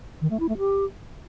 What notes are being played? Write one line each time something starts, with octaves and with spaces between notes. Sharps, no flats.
D#3
A3
E4
A3
G4